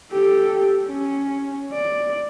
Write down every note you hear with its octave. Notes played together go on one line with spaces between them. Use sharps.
G4 A4
C#4
D5